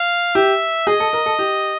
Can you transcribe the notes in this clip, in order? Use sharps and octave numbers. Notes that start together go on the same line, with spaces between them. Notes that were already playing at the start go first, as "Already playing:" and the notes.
Already playing: F5
G4 E5
G#4 D#5
A4
A#4
A4
G4